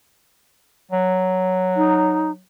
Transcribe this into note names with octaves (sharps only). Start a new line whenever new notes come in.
F#3
D#4